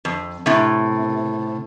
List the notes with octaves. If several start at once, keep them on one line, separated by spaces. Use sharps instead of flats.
F2
A2 C3